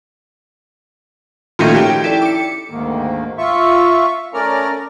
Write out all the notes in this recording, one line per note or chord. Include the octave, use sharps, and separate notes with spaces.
A#2 D#3 F3 A3 C#4 D#4
G4 G5
E4 A4 D5
D6 C#7
D2 G#2 D#3 A#3
F4 E5 C#6
A3 C#4 A#4 D5 A#5 F6